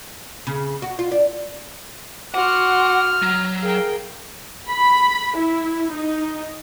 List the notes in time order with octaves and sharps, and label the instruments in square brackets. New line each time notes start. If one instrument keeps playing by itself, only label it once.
[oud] C#3
F#4
F4
D4
[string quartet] F#4 C6 [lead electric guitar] F#5 [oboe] D6 [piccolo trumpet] F6
[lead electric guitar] F#3
[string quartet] G#4 A#4 G5 [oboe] F5
[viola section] B5
E4
D#4